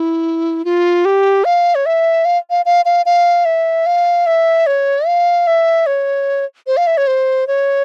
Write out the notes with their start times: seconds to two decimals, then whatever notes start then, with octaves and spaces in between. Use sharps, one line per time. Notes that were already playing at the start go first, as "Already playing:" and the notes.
Already playing: E4
0.65 F4
1.05 G4
1.45 F5
1.75 C#5
1.86 E5
2.25 F5
2.50 F5
2.66 F5
2.85 F5
3.06 F5
3.45 E5
3.86 F5
4.26 E5
4.67 C#5
5.07 F5
5.47 E5
5.86 C#5
6.67 C5
6.77 F5
6.87 E5
6.97 C#5
7.07 C5
7.47 C#5